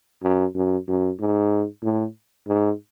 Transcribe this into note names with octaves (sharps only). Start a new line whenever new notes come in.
F#2
F#2
F#2
G#2
A2
G#2